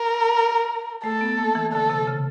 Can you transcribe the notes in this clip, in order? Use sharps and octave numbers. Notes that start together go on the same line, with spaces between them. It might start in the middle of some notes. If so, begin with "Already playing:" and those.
Already playing: A#4
A3 A4
B3
A#3
E3
D3 A4
C3
C#3